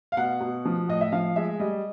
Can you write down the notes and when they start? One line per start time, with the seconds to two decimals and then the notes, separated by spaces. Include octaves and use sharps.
0.12 F5
0.17 B2 F#5
0.41 B2
0.65 F3
0.88 A2 D#5
1.01 E5
1.12 F3 F5
1.36 G#3 E5
1.60 G3 D#5